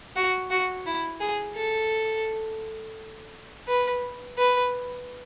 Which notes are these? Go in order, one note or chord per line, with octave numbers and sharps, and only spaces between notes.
F#4
F#4
E4
G#4
A4
B4
B4